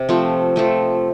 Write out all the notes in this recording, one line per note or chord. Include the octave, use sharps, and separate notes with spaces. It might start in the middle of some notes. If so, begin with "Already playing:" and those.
Already playing: C3
F3 A3 C4
F3 A3 C4